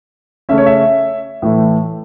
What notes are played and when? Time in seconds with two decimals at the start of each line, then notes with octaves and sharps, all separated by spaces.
0.49 C#3 A3 C#4 E5
0.58 C#5
0.66 E5
1.42 A2 E3 A3 E4